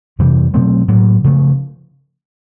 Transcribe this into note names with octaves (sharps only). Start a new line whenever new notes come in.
F2 C3 E3 G3
B2 F#3 A3 C4
A2 F#3 A#3
C#3 F3 A3